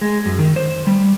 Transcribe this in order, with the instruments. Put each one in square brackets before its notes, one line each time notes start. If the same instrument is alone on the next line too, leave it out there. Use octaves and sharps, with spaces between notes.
[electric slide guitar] G#3
F#2
D#3
C5
G3